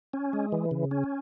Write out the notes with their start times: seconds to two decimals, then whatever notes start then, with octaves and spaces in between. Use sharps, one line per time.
0.13 C#4
0.33 G#3
0.52 E3
0.71 C#3
0.91 C#4